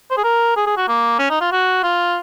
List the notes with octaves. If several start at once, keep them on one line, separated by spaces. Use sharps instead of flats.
C5
G#4
A#4
G#4
G#4
F#4
A#3
C#4
D#4
F4
F#4
F4